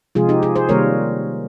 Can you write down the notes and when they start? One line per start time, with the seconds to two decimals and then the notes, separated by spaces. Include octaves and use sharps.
0.15 C3 F3 G#3 F4 G#4
0.29 D#4 G4
0.43 F4 G#4
0.56 G#4 C5
0.69 C3 D#3 G3 A#3 A#4 C#5